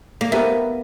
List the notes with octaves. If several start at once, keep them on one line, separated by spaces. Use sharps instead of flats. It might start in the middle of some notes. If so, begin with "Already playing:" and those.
A#3
B3 G4 A#4 E5